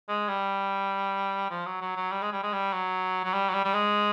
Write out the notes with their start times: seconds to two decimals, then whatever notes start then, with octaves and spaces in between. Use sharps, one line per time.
0.08 G#3
0.28 G3
1.50 F3
1.66 F#3
1.81 F#3
1.96 F#3
2.12 G3
2.22 G#3
2.32 G3
2.43 G#3
2.52 G3
2.73 F#3
3.24 F#3
3.33 G3
3.49 F#3
3.54 G3
3.65 G3
3.74 G#3